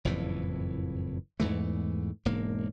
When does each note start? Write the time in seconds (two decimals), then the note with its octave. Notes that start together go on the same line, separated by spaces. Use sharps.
0.05 F#1 F2 A2 E3
1.40 E2 G#2 E3 A3
2.25 E1 G#2 A#3